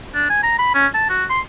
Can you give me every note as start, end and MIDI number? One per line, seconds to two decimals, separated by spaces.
0.15 0.29 62
0.30 0.40 80
0.43 0.54 82
0.59 0.70 83
0.74 0.87 61
0.94 1.08 81
1.10 1.25 66
1.30 1.40 84